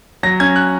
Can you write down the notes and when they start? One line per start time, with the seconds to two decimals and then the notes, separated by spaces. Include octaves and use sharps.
0.23 F#3 A#6
0.40 C#4 G#6
0.56 F#6